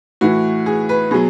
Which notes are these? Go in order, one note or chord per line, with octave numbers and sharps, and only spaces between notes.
A2 E3 F#4
G#4
B4
B2 F#3 G#4